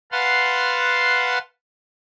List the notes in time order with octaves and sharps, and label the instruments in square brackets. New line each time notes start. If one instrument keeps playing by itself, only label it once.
[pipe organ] B4 F5 F#5 A5 C6